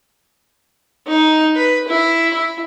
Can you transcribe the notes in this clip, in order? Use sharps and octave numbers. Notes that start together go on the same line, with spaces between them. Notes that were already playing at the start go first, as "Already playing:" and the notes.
D#4
B4
E4
E4